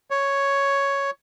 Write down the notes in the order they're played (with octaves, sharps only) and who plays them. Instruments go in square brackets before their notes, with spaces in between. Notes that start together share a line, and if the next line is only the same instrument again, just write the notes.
[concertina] C#5